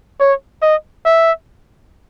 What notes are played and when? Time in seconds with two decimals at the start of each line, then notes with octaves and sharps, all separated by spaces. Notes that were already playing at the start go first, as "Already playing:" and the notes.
0.20 C#5
0.62 D#5
1.06 E5